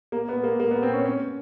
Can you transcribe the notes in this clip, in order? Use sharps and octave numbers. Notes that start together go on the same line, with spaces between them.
A#3
B3
A#3
A#3
B3
C4
C#4
C#4